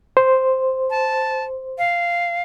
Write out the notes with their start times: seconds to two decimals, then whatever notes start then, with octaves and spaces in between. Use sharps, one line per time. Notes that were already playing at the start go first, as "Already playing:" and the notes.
0.17 C5
0.90 A5
1.78 F5